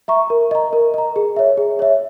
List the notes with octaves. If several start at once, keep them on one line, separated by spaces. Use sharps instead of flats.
E5 A#5 C#6
A#4
D#5 A#5
A#4
D#5 A#5
G#4
C#5 E5
G#4
C#5 E5